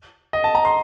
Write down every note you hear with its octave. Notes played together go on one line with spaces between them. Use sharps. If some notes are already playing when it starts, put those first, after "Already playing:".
D#5
A5
A#5
C6